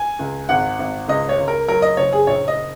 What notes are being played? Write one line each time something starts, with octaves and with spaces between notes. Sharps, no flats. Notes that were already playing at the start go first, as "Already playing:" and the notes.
Already playing: G#5
C#2
G#1 F#5
G#1
C#2 D#5
C#5
C#2
A#4
F#3 A#4
D#5
F#1 C#5
G#4
A#1 C#5
D#5